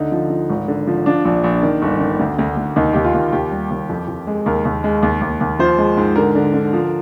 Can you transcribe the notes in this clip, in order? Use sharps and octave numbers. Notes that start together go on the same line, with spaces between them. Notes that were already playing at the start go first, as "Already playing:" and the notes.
Already playing: D2 D3 D#4
F3
F3
G#1
D3
F3
F3 D4
A#1
A#1
D#3
G1
D#3
D2
D2
D2
D#2 D#4
D#2 G4
F4
D#2
D#2 G4
G3
D#2
F2
F2
G#3
D#2 A#4
D#2
G#3
D#2
D#2
D#2
F3 C5
G#3
G#2
D3 A#4
D3
D3
F3